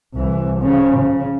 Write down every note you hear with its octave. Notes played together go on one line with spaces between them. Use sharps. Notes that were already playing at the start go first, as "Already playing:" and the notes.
C2 E3
C#3 F3
C#3